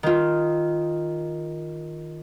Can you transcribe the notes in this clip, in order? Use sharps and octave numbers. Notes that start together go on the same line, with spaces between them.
D#3 F4